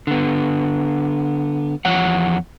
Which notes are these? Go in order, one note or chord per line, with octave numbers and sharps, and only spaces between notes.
D3 B3
E2 F3 C#5 F#5